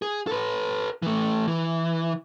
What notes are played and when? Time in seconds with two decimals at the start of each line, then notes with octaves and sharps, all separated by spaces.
0.02 G#4
0.27 A4 B4
1.02 E3 A3
1.47 E3